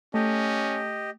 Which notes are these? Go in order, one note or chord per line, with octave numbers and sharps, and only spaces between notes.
A3 C#4 G4 D#5